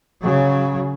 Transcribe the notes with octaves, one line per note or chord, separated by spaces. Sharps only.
C#3 F#3